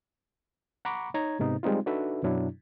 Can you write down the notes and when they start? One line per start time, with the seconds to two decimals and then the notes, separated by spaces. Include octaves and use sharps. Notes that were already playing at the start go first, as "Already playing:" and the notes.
0.85 F#5 A#5 B5 C#6 D6
1.14 D#4 C#5 A#5 G#6
1.39 G#2 C3 B3 D#4
1.63 G3 G#3 C4 D#4 F4
1.86 D4 D#4 F#4 A4 B4 E5
2.23 F#2 B2 F#3 D4 E4